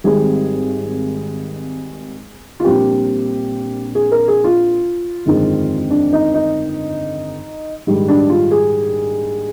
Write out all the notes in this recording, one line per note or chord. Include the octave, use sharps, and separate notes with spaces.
G#1 G#2 G3 C4 G#4
F4
A#1 A#2 G3 C4 G4
G#4
A#4
G#4
F4
G1 F2 D#3 G#3 C4
D4
D#4
D#4
A#1 G#2 D#3 G3
D4
F4
G#4